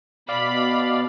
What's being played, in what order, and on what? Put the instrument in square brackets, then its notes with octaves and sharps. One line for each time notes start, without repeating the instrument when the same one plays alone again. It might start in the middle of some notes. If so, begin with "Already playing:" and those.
[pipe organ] B2 [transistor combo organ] D5 F5 [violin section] B5